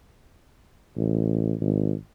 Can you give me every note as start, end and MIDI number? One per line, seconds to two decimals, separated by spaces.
0.96 1.53 33
1.61 1.93 32